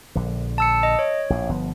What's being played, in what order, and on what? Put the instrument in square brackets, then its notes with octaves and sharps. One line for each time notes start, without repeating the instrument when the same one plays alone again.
[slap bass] A#1 D3
[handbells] A5 E6 C#7
D#5
C#5
[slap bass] A#1 A2
G1 F3 B3